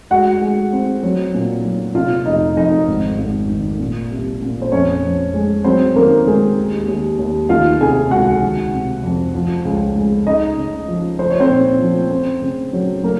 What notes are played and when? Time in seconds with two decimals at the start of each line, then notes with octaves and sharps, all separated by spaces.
0.10 G#3 F#4 F#5
0.41 G#3
0.73 C4
1.03 F#3
1.34 A#2
1.65 F#3
1.95 C3 F4 F5
2.26 F1 D#4 D#5
2.56 F2 D#4 D#5
2.88 G#1
3.18 G#1
3.49 D#3
3.80 A#2
4.11 C2
4.42 A#2
4.62 C5
4.72 F2 C#4 C#5
5.04 F2
5.34 G#3
5.65 F#3 C4 C5
5.96 D#3 A#3 A#4
6.27 D#3 G#3 G#4
6.57 D#2
6.88 D#2
7.19 D#2
7.49 D#3 F4 F5
7.80 C3 G#4 G#5
8.10 C#2 F#4 F#5
8.42 D#3
8.73 C3
9.04 F2
9.35 F3
9.65 C#2
9.96 G#3
10.26 C#2 D#4 D#5
10.58 C#3
10.88 F3
11.19 F3 C5
11.30 C#5
11.40 C4 C5
11.50 A#2
11.80 F3
12.11 C4
12.42 C#3
12.73 F#3
13.03 F#3 A#3 A#4